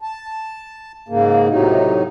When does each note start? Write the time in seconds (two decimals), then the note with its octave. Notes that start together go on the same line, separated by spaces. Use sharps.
0.01 A5
1.09 G#2 C#3 A#3
1.48 A2 C3 F#3 D#4